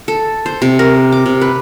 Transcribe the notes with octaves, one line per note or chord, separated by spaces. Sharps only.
A4
C5
C3
A#4
D6
C3
B4